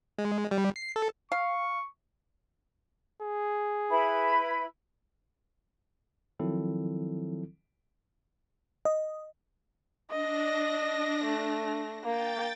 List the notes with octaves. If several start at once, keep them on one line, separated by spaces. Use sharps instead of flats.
G#3
G3
C7
A4
F5 C#6
G#4
E4 B4 B5
D#3 F3 F#3 C4 E4 A4
D#5
D4 D#5 A#6
A3
A#3 G5 A6